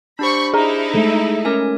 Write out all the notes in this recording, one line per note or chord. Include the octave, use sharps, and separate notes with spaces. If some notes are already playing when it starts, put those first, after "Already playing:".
D4 G4 C5 B5 C#6
D#4 E4 G#4 A#5
G#3 A3 A4
C#4 A#4 G#5